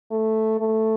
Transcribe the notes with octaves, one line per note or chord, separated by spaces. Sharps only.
A3
A3